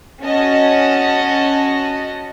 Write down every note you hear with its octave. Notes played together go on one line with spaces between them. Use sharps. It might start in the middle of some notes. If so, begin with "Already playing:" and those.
C#4 F#4 D#5 A5